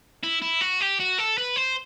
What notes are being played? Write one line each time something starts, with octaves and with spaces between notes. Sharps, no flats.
E4
E4
F#4
G4
F#4
A4
B4
C5